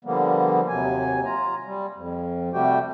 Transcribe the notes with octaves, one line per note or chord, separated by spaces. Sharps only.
D3 F3 G3 A#3 B3
D#2 C3 F#3 G#5
F4 A#5
G3
F2
C3 G3 A3 F#4 G4 G5